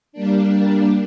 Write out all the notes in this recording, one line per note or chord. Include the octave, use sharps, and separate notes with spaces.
G3 A#3 D4